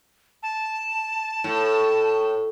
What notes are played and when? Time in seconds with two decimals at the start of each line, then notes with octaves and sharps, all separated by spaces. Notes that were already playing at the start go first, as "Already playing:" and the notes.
0.43 A5
1.44 A2